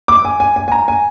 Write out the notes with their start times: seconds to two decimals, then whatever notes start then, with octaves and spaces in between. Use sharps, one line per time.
0.08 D6
0.25 G#5
0.40 G#5
0.56 G#5
0.68 G#5
0.72 A#5
0.88 G#5